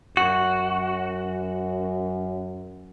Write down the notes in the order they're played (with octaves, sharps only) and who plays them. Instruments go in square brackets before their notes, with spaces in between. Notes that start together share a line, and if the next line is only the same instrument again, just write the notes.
[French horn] F#2 [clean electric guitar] F#4